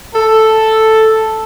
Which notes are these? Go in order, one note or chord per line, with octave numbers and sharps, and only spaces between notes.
A4